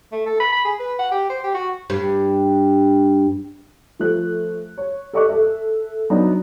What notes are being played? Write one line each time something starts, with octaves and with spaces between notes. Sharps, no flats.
A3
A4
B5
B5
G#4
B4
F#5
G4
C5
G4
F#4
G2
F3 A3 F#6
C#5
A4 D5 D#5 C#6 D6 F#6
A4 E5
F#3 B3 D4 D#4